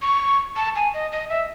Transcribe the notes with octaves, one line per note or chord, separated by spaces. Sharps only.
C#6
A5
G#5
D#5
D#5
E5